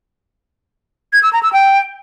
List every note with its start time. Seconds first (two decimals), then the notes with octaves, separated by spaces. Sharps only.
1.13 G#6
1.23 E6
1.33 A#5
1.43 E6
1.53 G5